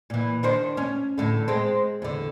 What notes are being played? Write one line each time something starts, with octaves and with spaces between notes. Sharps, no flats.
A#2 E3
D#3 D4 C5
C#4
E2 A2 D3
G#3 C4
E2 D3